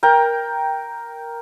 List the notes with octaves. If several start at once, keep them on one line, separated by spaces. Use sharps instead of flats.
A#4 G5 A#5